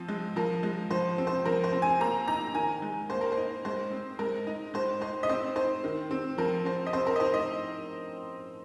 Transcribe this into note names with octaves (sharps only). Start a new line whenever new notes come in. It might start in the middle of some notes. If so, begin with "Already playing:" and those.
Already playing: F3 C4
G#3
F3 A#4
G#3
F3 C5
C4
C5
F3 A#4
C5
C4
G#5
A#3 A#5
D#4 A#5
D#3 G#5
G#3
A#3 C5
A#4
C5
D#4
G#3 C5
C4
G#3 A#4
D#4
G#3 C5
D#4 C5
D#5
C4 C5
D#4 C5
D#3
C4
F3 A#4
C4 C5
D#5
C4 C5
A#4
D#5
D#4 C5
D#5